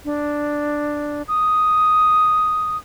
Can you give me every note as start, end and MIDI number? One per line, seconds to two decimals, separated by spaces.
0.05 1.22 62
1.28 2.77 87